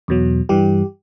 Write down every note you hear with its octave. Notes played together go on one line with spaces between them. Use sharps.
E2 B2 F#3
G2 E3 G3 G4